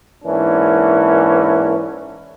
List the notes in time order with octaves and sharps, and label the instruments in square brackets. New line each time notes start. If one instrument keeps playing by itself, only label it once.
[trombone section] G#2 E3 A#3 C#4 D4